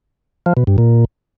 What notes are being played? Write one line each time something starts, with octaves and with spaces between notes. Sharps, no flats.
F3
B2
G2
A#2